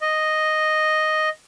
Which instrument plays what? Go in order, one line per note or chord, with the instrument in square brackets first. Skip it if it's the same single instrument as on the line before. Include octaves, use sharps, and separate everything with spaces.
[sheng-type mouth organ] D#5